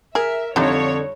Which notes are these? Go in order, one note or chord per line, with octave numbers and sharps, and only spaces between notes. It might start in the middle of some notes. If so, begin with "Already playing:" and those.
G#4 A#4 E5
F2 D3 G3 D#4 F4 C#5